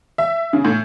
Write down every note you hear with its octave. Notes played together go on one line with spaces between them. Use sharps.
E5
C#3
A2